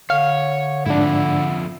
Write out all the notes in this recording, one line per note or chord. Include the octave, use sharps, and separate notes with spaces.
D3 C#5 F5
F2 G#2 D3 D4 E4